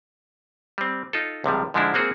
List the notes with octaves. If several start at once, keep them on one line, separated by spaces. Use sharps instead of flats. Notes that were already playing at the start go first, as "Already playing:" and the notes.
G3 C4
D#4 F4 A4
C#2 C3 F3 G3
G#2 D3 F3 G#3 D4 E4
G#3 A#3 C4 F#4 G#4